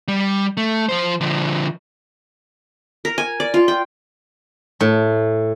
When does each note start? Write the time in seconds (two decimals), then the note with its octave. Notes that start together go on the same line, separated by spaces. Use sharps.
0.08 G3
0.57 A3
0.89 F3 C5
1.21 D3 F3
3.05 A#4
3.18 G#5
3.40 D5
3.54 F4
3.68 G5
4.81 A2